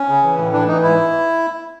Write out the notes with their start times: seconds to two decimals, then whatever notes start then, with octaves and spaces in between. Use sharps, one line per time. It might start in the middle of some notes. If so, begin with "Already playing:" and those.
Already playing: C#4
0.08 C#3
0.22 E3
0.37 A2
0.53 E3 D4
0.67 E3 D#4
0.83 G#2 E4